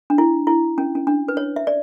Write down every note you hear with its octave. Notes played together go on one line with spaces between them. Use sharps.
D4
E4
E4
C#4
C#4
D4
B4
C#5
E5
D5